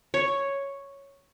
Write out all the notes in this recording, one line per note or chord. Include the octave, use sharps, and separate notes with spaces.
C#5